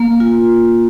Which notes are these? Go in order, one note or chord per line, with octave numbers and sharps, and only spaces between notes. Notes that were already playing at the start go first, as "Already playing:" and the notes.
Already playing: A#3
F4